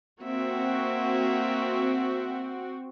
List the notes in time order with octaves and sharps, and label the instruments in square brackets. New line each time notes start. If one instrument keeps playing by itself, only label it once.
[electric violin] A#3 E5 [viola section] C4 F#4